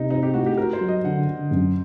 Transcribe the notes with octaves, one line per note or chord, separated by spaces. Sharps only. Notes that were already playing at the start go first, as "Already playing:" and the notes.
Already playing: C3 D#4
C4 D#4
G4
A2 F#4
G4
F#4 A#4
C5
F#3
D#5
D3 F#5
D3
F#2